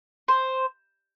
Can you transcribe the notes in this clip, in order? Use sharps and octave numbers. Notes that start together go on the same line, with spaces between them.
C5